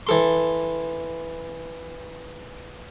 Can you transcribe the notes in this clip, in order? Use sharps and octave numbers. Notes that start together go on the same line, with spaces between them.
E3 A4 C6